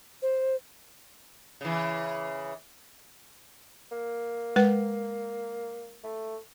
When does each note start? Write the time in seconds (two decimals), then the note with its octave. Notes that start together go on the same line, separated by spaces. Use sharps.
0.22 C5
1.61 C#3 E3
3.91 A#3
4.56 G#3 B4
6.04 A3